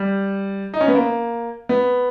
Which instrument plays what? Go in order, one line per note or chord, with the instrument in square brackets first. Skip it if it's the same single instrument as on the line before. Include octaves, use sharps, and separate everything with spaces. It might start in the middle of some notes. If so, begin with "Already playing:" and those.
Already playing: [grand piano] G3
D#4
C#4
B3
A#3
B3